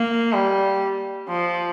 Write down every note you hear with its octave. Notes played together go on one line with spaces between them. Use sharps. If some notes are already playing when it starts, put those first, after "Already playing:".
Already playing: A#3
G3
F3